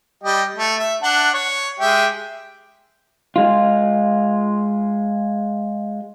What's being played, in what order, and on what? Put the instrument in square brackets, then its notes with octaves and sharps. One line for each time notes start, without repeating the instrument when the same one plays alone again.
[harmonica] G3 G4 D#5
A3
E5
D4 F#5 A5
C#5
G#3 G4 E5
[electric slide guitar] G#3 F4